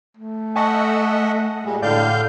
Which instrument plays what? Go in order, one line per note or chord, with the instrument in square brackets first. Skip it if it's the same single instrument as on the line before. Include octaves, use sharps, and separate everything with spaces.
[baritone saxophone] A3
[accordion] D#5 E5 F#5 [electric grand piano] G#5 A5 C#6
[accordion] A#2 G3 [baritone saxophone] G#3
[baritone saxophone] A2 [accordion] D3 F5 G6 [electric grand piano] D5